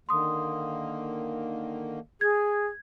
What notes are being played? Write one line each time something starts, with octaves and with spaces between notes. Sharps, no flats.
D3 D#3 A#3 C6 D#6
G#4 G#6